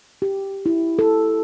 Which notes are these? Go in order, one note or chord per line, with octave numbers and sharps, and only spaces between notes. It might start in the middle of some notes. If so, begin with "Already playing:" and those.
G4
E4
A4